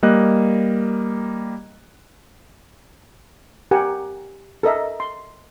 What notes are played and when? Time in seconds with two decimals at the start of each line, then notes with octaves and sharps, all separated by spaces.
0.03 G3 A#3 D#5 F#6
3.71 G4 A#4 F#5 G#5
4.63 A4 A#4 D#5 E5
5.00 C6